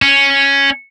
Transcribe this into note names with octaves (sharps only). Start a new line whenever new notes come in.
C#4